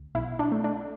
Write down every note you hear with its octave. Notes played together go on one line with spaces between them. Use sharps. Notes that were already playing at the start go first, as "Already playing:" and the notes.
Already playing: D2
B1 E4
D4
A3
D4